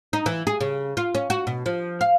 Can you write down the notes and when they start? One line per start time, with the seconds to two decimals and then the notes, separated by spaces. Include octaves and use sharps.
0.13 D#4
0.26 E3
0.47 G#4
0.61 C#3
0.97 F4
1.15 C#4
1.30 F#4
1.47 B2
1.66 F3
2.01 F5